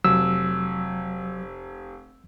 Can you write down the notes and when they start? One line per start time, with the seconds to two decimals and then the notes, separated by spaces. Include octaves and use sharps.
0.05 F1 F#3 E6